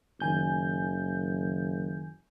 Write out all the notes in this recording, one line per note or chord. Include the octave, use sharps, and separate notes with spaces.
F#1 D#3 G#5 G6